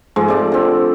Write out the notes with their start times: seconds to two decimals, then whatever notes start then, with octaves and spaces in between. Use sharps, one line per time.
0.16 G#2 F3 G#3 A3
0.28 C3 D5 A5
0.52 D3 C4